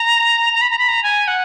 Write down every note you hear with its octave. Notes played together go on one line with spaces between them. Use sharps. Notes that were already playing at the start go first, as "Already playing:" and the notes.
Already playing: A#5
A#5
B5
A#5
B5
A#5
G#5
F#5